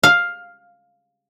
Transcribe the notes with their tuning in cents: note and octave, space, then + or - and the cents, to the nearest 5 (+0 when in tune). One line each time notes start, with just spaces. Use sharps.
F5 +5